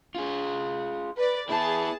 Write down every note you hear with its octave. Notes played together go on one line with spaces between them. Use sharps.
F4 G#4
B4 D5
B3 E4 G#4 A5